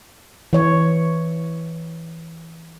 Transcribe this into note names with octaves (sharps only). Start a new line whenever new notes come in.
E3 C#5